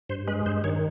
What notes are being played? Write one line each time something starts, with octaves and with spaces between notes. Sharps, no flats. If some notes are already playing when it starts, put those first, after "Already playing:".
G2 C5
G#3 B4
G2 C5
D#3 C#5